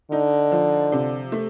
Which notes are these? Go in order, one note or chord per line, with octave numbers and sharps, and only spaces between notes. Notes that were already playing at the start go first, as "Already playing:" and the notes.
D3 D#4
F3
C3
A3